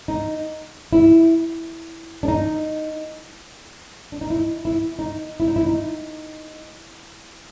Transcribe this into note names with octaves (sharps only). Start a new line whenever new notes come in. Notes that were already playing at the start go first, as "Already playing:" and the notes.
D#4
E4
D4
D#4
D4
D#4
E4
E4
D#4
E4
D#4
E4
D#4